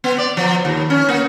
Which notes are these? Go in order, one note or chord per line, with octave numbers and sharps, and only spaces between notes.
B3
D5
F3
D#2
C#4
A#3